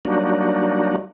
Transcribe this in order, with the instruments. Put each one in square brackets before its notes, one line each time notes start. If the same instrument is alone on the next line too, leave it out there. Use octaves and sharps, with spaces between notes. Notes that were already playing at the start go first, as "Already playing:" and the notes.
[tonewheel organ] F#3 G3 A#3 D4 D#4 F#4